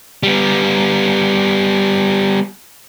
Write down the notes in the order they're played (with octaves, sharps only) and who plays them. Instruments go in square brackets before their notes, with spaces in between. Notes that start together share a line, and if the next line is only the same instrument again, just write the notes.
[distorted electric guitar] G3 B3